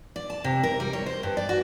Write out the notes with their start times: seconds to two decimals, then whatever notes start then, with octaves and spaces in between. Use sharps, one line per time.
0.16 D5
0.30 A5
0.44 C3
0.63 A#4
0.80 G3
0.93 C#5
1.06 C5
1.23 G2
1.37 D5
1.49 F#4